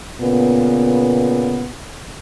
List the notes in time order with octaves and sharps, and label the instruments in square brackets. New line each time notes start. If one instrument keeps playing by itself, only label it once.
[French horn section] A#2 C#3 B3